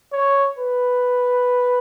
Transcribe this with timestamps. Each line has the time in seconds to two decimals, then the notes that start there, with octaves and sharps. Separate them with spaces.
0.13 C#5
0.59 B4